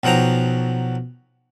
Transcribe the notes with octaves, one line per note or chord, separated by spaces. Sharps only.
B1 F3 F#3 G5 A#5